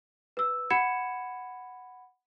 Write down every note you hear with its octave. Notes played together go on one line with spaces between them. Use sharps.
B4 E6
F#5 B5 G#6 C#7 E7